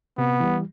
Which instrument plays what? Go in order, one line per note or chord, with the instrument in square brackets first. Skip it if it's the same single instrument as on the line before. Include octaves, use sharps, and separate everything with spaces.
[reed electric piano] C3 [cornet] B3
[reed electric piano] E3 G3